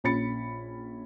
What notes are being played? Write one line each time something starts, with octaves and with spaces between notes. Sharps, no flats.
A#1 C#4 B5 A6 C#7